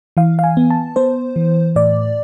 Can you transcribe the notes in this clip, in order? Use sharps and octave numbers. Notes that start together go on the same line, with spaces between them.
E3 F5
F5
G#5
B3
A5
B3 C5
E3
A2 D5